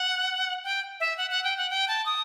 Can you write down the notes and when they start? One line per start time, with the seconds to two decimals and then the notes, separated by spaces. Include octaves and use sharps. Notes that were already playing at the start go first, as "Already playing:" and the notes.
Already playing: F#5
0.64 G5
1.00 E5
1.18 F#5
1.30 F#5
1.44 G5
1.57 F#5
1.70 G5
1.88 A5
2.06 D#6